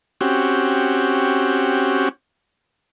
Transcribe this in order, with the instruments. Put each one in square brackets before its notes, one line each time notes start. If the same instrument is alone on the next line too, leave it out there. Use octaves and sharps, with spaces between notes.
[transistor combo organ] C4 C#4 F#4 G4